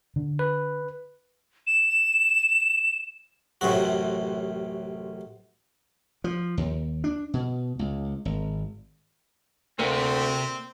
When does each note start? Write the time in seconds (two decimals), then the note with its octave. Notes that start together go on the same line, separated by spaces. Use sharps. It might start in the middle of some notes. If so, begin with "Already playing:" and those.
0.16 D3
0.39 B4
1.67 E7
3.61 A1 F#2 A2 C3 F#4
6.24 F3
6.58 D#2
7.04 D4
7.34 B2
7.79 C#2
8.25 G#1
9.79 D2 C3 A#3 C4